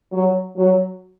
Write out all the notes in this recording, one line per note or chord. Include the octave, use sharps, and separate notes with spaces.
F#3
F#3